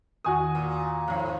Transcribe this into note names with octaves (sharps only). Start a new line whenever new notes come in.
E2 D#3 F#4 G#5 C#6 D#6
A#2
F2 G#2